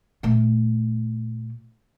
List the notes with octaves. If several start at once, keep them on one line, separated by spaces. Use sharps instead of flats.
A#2 A3